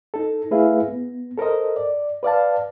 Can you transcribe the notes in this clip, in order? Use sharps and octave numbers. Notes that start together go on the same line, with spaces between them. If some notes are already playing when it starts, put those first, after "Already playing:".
D#4 A4
A3 E4 G#4 B4 E5 F5
B3
A4 A#4 C5 D#5
D5
B4 D5 F5 A5